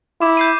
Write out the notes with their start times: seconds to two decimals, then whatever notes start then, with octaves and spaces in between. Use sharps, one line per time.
0.21 E4 D6
0.37 G6 C7 D#7